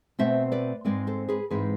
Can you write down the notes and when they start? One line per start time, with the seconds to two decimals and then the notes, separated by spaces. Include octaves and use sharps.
0.19 B2 A3 C4 C5 E5
0.52 B4 D5
0.85 G#2 E3 G#3 C4 B4 D5
1.07 A4 C5
1.29 G#4 B4
1.50 G#2 E3 G#3 C4 G#4 B4